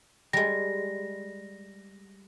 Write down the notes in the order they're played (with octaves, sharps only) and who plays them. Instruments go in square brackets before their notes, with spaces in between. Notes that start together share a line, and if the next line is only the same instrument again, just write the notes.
[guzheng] G3 G#3 [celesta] A#6